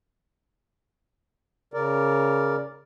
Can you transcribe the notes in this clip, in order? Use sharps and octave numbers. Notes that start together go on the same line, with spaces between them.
C#3 A#4 D5